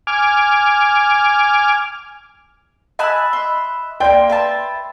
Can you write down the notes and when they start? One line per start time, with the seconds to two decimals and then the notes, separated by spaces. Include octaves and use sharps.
0.07 G#5 D6 F6
2.99 D#5 G#5 A5 B5 E6 F#6
3.33 E5 C6
4.00 A3 A#3 D5 G5 C6
4.30 B4 E5 A5